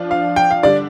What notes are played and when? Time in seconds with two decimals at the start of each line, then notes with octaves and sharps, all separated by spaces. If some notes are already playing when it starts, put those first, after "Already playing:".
Already playing: F3 D4 F4
0.11 F5
0.36 G5
0.51 F5
0.63 D3 G3 D4 D5